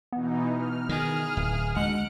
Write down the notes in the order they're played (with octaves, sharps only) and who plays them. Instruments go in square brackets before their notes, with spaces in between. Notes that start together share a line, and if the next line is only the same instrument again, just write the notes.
[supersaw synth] B2 E3 D#4 [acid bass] B3
[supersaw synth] F6
[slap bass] D#3 [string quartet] G#4
[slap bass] D1
[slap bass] D2 [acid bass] G#3 [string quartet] F#5 F#6 [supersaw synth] D7